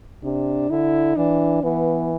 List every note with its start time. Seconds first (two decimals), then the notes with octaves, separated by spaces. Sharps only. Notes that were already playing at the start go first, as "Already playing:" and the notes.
0.23 C3 D4
0.70 D3 E4
1.17 E3 D4
1.63 E3 B3